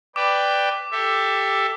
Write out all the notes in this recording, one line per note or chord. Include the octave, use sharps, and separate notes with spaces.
B4 D5 G5 D6
G4 A4 E5